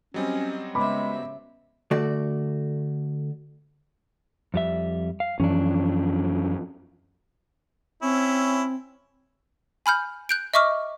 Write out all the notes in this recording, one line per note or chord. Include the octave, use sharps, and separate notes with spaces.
F#3 G3 C4 C#4 D#5
C#3 G#3 B3 E5 B5 D6
D3 A3 F#4 D5
F2 G3 E5
F5
F#2 E3 F3 C#4 D4
C4 C#4 E4
G#5 B5 F6 G6
F#6 G6 D7
D#5 E5 C#6 D6 F6